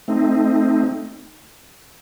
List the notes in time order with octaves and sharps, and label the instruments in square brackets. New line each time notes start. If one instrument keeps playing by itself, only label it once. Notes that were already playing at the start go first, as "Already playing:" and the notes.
[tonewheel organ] A3 C4 D#4